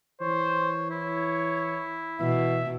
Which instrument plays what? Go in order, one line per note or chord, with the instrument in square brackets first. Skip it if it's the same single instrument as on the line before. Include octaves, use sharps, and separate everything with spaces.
[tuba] E3 [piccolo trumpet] C5 [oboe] C#5
[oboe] E4 [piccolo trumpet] C#5
[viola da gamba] B2 [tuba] E3 [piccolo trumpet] E5